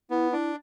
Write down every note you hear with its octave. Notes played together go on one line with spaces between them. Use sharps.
B3 E4
D4 E4